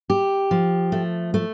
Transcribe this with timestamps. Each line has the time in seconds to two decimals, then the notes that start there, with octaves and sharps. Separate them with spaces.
0.10 G4
0.51 F3
0.92 A3
1.34 A3